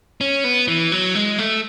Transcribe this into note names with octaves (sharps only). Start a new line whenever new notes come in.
C#4
B3
E3
F#3
G#3
A3